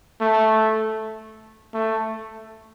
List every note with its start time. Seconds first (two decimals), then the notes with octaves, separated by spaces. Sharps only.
0.21 A3
1.74 A3